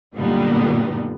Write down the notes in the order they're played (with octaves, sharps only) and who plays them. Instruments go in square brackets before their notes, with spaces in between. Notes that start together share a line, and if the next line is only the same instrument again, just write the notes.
[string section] F#2 A#2 D3 G3 B3 D#4